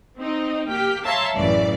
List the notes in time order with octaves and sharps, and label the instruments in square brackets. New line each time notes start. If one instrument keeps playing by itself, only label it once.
[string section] C4 D#4
A#3 G4 G5 F6 B6
C#5 E5 F5 A5 A#5 C6
A1 F#2 A2 C#3 E3 D5